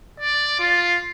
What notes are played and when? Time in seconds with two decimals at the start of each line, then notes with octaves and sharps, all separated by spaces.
0.20 D5
0.59 F4